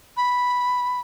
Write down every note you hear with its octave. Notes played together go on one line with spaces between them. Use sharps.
B5